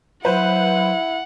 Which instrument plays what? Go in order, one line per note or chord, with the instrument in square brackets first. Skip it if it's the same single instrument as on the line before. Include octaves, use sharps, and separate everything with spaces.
[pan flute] F#3 [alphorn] E4 [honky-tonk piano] B4 C5 [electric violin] F#5